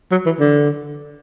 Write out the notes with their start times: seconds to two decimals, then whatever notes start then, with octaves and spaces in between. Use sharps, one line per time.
0.11 F#3
0.26 E3
0.39 D3